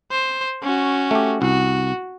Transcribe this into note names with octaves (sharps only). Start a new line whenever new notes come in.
C5
C#4 F#4
A3 G4
C2 F#4